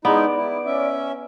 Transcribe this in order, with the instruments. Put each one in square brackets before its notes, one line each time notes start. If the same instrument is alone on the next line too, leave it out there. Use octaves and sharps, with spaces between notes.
[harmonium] G#3 D#4 E4 [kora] B3 [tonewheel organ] D5
[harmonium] E4
C#4 E5